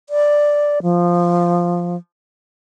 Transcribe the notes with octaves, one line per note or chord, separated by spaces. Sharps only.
D5
F3